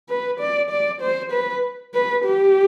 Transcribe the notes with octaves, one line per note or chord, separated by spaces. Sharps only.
B4
D5
D5
C5
B4
B4
G4